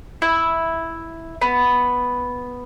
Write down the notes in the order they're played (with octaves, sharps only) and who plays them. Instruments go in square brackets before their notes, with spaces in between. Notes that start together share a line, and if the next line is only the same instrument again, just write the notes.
[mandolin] E4
B3